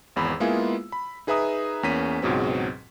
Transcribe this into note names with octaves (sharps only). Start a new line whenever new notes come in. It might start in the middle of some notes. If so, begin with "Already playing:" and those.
G#1 E2 B5 E6
G#3 A#3 B3 E4 F4 G#4
B5
D#4 G#4 B4 E5 A#5 D#6
E2 A#3 C#4 B6 D#7
C#2 G#2 B2 F#3 C4